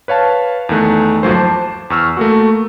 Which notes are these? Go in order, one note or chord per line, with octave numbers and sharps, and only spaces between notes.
B4 C#5 F5 A5
E2 D#3 A3 F#6
G1 D#2 F3 F#3 A3 C5
C5 A5 D6
E2 C#6 E6 F6
A3 A#3 F#4